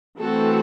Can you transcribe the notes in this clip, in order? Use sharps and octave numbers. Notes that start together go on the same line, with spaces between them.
E3 A3 C4 F#4 A4